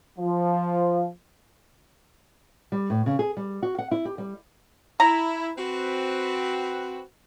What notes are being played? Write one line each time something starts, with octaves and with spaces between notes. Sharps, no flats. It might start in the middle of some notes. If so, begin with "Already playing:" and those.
F3
G3
A2
C#3
G#4
G3
F#4
F#5
E4
G4
G3
E4 A#5
C4 F#4 B4